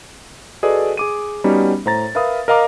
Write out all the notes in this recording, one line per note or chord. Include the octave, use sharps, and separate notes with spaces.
F#4 G#4 A4 B4 D5 D#5
G#4 D6 D#7
G3 B3 C#4 D#4 F#4 G4
A2 C5 A#5 A6
A#4 B4 E5 F5 B5 D#6
A#4 D#5 F5 A#5 D6